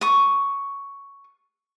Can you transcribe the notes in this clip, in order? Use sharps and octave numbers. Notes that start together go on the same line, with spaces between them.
C#6 D#6